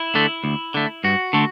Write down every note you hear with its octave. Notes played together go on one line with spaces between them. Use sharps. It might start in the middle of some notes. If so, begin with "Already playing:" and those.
Already playing: E4
D3 A3
D2
D3 A3
G2 F#4
D3 A3